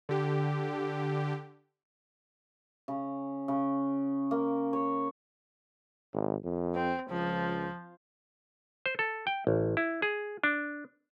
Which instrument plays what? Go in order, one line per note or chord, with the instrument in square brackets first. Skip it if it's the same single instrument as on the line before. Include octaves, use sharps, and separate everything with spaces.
[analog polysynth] D3 G4
[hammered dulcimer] C#3
C#3
A#3
C#5
[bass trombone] G#1
F2
[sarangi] C4
[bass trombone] C#2 [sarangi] F3
[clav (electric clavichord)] C5
A4
G5
A1
E4
G#4
D4